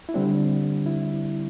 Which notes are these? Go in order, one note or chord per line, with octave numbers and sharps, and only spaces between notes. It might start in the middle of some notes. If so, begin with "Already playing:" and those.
E4
D3 G3 C4 D4
E4